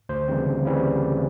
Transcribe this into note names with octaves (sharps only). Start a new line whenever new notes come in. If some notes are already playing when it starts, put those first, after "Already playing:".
D2 C5
C#3 E3 G3 C4
D2
C#3 E3 G3 C4